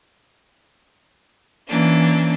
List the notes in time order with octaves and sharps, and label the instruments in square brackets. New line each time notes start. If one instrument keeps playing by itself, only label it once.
[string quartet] E3 A#3 C#4 D4